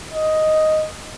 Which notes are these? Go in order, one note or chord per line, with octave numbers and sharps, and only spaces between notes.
D#5